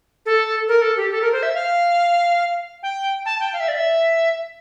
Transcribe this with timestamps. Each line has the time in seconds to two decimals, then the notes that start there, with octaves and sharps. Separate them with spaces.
0.26 A4
0.68 A#4
0.82 A4
0.97 G4
1.11 A4
1.22 A#4
1.32 C5
1.43 E5
1.54 F5
2.83 G5
3.26 A5
3.40 G5
3.53 F5
3.60 E5
3.68 D5
3.75 E5